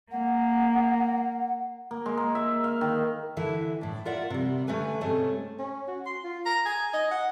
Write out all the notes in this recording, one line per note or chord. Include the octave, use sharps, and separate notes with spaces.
A#3 F#5
A#3
G#3
A#3
E5
F5
D#3
D3 E3 E4
A2 D4
F4 A#4 D5 E5 F#5
C3 G3
D3 A3 C#4 B4 G#5
G#2 C3 A3 C#4
C#4
F#4
C6
F4
A#5
G#5
D#5
F#5